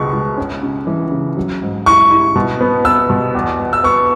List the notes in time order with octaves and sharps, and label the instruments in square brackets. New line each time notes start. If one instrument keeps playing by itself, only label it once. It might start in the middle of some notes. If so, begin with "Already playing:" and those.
Already playing: [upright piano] C#2 B2 G#3 [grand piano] C#6
[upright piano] C#2
C#4
C#3
E3
C#3
F#3
G#2
[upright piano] E4 [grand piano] C#6
[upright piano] E4
B2
B3
[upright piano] B3 [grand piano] E6
[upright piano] B2
E2
E2
[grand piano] E6
[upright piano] B3 [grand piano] C#6